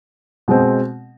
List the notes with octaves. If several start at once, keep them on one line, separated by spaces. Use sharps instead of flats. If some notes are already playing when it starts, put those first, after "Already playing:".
B2 G#3 C4